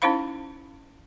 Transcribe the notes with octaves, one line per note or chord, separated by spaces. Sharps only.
C#4 D#4 E4 C5 F5 B5